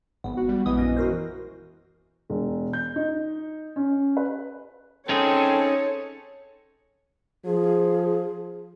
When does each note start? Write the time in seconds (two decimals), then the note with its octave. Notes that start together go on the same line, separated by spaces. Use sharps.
0.24 G#1 B3
0.37 F#4
0.48 G3
0.66 A#1 E3 G#3 B3 D#6
0.77 F#2 D#5
0.96 F#4 A#4 C5
2.30 E1
2.73 G6
2.96 D#4
3.76 C#4
4.17 B4
5.09 C4 C#4 D#4 G#4 A4 C#5
7.45 F3 G#4